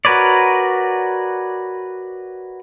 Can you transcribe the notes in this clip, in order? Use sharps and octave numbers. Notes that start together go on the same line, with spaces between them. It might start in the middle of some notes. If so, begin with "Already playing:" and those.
F#4 A#4 B4 C#5 D5